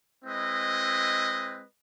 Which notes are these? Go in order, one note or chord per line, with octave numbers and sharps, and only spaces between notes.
G#3 C4 E4 B4 D#5